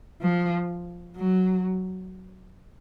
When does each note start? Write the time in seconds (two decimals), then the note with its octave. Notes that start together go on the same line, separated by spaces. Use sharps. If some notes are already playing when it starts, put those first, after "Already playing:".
0.21 F3
1.16 F#3